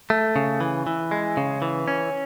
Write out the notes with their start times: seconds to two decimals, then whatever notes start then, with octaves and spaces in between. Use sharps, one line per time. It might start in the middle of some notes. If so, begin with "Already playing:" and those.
0.10 A3
0.36 C#3
0.61 E3
0.87 E3
1.11 G#3
1.37 C#3
1.62 E3
1.88 C#4